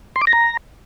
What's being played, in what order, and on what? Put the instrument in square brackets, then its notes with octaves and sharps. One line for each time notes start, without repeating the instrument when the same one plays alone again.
[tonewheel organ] C6
D6
A#6
A#5